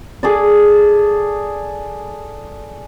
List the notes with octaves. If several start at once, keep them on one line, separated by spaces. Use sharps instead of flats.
G#4 A4 D5